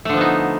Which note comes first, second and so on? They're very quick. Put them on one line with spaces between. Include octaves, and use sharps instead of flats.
A3 D3 F3 B3 D#4